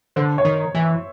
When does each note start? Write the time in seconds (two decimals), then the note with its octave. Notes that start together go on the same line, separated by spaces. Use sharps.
0.16 D3 C5
0.38 C#5
0.45 D#3
0.75 E3
0.82 E5